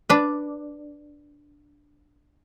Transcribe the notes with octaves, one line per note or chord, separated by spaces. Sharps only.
D4 B4